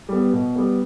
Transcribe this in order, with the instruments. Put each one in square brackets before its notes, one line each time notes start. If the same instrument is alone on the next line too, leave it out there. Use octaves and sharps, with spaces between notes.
[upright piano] G3 B3
B2
G3 B3